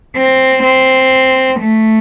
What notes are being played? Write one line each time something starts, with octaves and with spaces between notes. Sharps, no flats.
C4
C4
A3